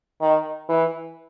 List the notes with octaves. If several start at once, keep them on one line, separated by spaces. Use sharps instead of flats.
D#3
E3